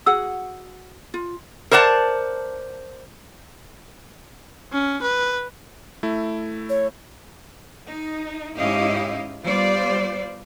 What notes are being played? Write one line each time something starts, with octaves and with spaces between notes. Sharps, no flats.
F#4 G#4 F#5 E6
F4
A#4 C5 D5 F#5 A5
C#4
B4
A3 E4
C#5
D#4
G#2 C#4 E4 G4 D#5 F5
G3 B3 F4 C5 D5